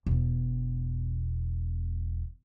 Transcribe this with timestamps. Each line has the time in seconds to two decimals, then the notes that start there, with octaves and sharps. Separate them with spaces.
0.06 E1 B3